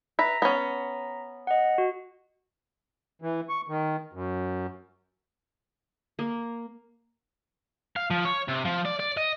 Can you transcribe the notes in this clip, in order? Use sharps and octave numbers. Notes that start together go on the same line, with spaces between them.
B4 E5 A#5 A#6 B6
B3 C#4
D#5 F#5
F#4
E3
C#6
D#3
F#2
A#3
F5
F3
C#5
C3
F3
D5
D5
D#5